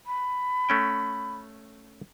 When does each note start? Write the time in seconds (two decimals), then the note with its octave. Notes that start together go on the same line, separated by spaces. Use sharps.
0.06 B5
0.69 A3 C#4 G5